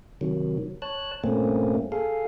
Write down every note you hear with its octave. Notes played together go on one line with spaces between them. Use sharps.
C3 D#3 F#3
C#5 A5 F#6
G2 A#2 A3 A#3 C4 C#4
G#4 A4 F5